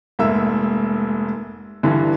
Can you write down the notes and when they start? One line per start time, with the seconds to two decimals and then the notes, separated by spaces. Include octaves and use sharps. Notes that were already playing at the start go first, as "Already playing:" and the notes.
0.19 F1 G#2 A#3 E5 E6
1.83 G2 D3 E3